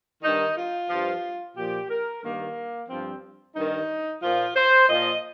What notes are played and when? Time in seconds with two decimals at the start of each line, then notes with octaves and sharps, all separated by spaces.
0.23 G2 D#3 D#4
0.57 F4
0.89 G2 F3
1.56 A#2 F3 G4
1.90 A#4
2.22 G2 D#3 A#3
2.89 G2 F3 C4
3.56 G2 D#3 D#4
4.22 A#2 F3 F4
4.56 C5
4.89 A#2 F3 D#5